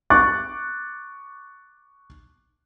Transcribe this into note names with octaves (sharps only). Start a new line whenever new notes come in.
C#6 D6 F#6 A6